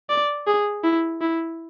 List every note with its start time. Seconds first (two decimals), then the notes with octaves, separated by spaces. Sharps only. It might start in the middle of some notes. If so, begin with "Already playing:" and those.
0.10 D5
0.47 G#4
0.84 E4
1.21 E4